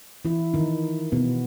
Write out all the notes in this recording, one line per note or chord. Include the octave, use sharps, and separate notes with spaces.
E3 E4
D#3 D#4
B2 B3